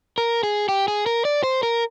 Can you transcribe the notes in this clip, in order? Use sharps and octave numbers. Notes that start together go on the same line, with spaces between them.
A#4
G#4
G4
G#4
A#4
D5
C5
A#4